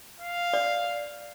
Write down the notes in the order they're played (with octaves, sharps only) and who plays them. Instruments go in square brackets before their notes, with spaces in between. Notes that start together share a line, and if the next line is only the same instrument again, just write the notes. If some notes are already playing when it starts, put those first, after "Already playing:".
[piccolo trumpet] F5
[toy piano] D5